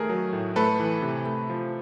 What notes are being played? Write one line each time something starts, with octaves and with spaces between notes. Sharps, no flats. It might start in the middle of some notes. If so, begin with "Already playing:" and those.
Already playing: D#3 A3 G#4 A#4
F#3
A2
A3 A4 B4
E3
C3
A3
F3